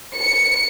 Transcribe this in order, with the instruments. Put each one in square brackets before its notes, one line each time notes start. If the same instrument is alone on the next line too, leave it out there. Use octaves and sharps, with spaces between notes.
[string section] C#7